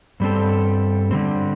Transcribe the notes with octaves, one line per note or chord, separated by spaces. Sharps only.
G2 G3 C4 A4
D3 G3 C4